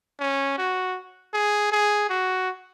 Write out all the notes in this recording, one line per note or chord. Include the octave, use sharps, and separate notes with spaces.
C#4
F#4
G#4
G#4
F#4